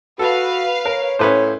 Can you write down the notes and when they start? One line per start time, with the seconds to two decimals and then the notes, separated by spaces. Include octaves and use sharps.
0.19 F#4 A4 B4 F5
0.85 A#4 C#5
1.19 A2 C#4 B4 C5